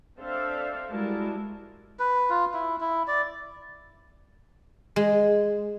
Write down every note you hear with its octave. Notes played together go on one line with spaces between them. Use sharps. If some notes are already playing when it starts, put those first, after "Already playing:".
C4 D4 A4 C5 E5 F5
G3 G#3 E4 F#4 A#4 A5
B4
F4
E4
E4
D5
G#3